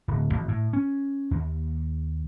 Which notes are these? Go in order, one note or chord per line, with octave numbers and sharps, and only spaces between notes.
D1
G#1
A2
C#4
D#2